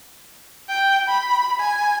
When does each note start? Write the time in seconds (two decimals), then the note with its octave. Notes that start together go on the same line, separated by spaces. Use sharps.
0.69 G5
1.08 B5
1.59 G#5